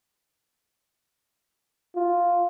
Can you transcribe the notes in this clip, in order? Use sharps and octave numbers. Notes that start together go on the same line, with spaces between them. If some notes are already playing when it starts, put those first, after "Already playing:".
F4